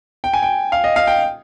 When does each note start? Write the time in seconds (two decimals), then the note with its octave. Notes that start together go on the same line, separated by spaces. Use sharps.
0.24 G5
0.34 G#5
0.43 G5
0.72 F5
0.84 D#5
0.96 F5
1.07 G5